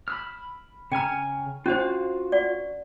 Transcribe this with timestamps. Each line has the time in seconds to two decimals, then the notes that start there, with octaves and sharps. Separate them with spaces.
0.08 B5 E6 F6
0.92 C#3 G5 G#5 A#5 F6
1.66 C#4 D4 F4 F#4 C5 F5
2.32 D5 F#5